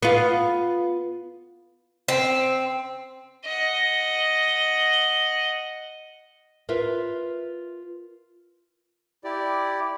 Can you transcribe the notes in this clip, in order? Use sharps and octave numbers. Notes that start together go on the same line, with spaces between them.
B3 F4
C4
D#5 F#5
F4 A#4 B4 E5
E4 G4 D5